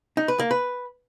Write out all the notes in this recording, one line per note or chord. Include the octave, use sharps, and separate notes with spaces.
D#4
B4
A#3
B4